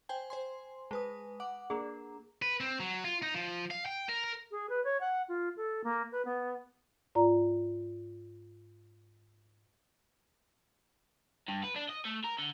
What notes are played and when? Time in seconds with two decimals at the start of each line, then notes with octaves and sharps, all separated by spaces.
0.09 C5 G5 G#5
0.30 C5 G#5 C6
0.91 G#3 B4 A5 D#6
1.40 F#5 D6
1.70 A#3 D4 G#4
2.42 B4
2.60 C4
2.80 F#3
3.04 F4
3.22 D#4
3.34 F3
3.71 F5
3.86 G5
4.09 A#4
4.24 A#4
4.51 G#4
4.69 B4
4.84 C#5
5.01 F#5
5.28 F4
5.57 A4
5.84 A#3
6.12 B4
6.25 B3
7.15 G#2 F4 D5 A#5
11.48 G2
11.64 B4
11.76 D4
11.89 D#5
12.05 A3
12.24 A#4
12.39 D3